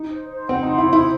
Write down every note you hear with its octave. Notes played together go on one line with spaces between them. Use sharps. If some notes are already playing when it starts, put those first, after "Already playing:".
Already playing: D#4
C5
C5
C4 F#5
D#4
C6
E4
C5
E4